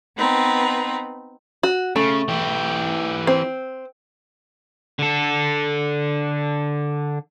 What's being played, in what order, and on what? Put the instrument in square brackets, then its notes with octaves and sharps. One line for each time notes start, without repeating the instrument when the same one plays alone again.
[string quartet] B3 C4 D#4 B4
[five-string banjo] F#4
[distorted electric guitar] C#3 [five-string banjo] A3
[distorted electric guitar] E3 G4
[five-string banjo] C4
[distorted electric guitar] D3 A4